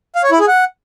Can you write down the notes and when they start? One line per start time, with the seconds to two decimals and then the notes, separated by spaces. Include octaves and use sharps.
0.15 F5
0.23 C#5
0.32 E4
0.40 G#4
0.48 F#5